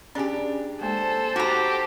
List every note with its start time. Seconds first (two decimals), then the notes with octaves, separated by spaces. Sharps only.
0.15 C#4 D4 G4 G#4 G#5
0.81 G#3 A#3 A4 C5
1.36 D#4 F#4 G4 A#5